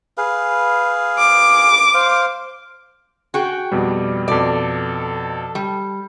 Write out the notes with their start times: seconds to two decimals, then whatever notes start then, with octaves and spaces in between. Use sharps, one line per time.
0.17 G#4 B4 F5
1.18 D6
1.94 C5 F5
3.34 F#4 G#4 G5
3.72 F2 B2 G3 D5
4.28 F2 B2 A4 D5
5.55 G3